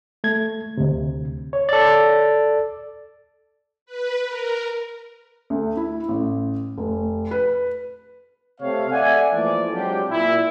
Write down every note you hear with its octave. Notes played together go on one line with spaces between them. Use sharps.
A3 G#6
D2 C3
C#5
A4 D5
B4
A#4
D2
E4
A1
F1
B4
C3 A3 C4 C#5 F5
A3 D5 E5 F#5 G#5
E3 F3 A3 A#3 D5
F#3 G#3 C4 D4 F4 G4
A#2 E4